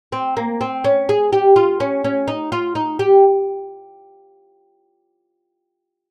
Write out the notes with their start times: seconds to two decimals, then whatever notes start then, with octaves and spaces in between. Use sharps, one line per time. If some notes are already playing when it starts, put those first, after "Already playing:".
0.12 C4
0.37 A#3
0.61 C4
0.84 C#4
1.09 G#4
1.32 G4
1.56 F4
1.80 C#4
2.04 C#4
2.28 D#4
2.52 F4
2.75 D#4
2.99 G4